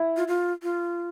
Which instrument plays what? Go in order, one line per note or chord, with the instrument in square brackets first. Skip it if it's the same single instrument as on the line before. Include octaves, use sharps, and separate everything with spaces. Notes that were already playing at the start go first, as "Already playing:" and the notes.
Already playing: [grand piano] E4
[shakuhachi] F4
F4
F4